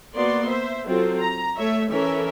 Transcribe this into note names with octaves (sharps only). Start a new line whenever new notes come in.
A#3 B3 F#4 D5 C6
C5 E5
F#3 C4 F4 A4
A#5
A3 C#5 E5
E3 C#4 A4 A#4 E5